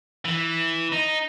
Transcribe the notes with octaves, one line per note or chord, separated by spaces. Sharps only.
E3
D#4